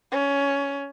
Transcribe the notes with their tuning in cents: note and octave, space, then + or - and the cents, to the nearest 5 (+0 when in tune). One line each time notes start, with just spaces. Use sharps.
C#4 +15